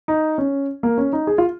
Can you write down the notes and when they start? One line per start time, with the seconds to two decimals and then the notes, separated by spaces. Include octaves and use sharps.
0.08 D#4
0.38 C#4
0.83 A#3
0.98 C#4
1.13 D#4
1.27 G#4
1.38 F4